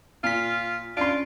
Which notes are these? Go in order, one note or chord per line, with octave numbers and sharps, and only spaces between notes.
A#2 F4 F6 B6
C#4 D4 F4 C6 D7